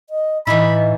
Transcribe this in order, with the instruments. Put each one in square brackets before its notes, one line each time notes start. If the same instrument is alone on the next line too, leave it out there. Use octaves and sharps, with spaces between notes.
[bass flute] D#5
[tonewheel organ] A2 [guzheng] E3 D#4 E4 [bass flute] D#5 [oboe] B5